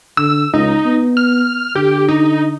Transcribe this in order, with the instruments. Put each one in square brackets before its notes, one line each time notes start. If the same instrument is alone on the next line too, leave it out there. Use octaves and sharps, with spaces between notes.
[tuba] D3 [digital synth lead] E6
[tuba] C#2 [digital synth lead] D#4
[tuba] B3
[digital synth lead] F6
[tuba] D3 [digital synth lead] G4
[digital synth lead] D#4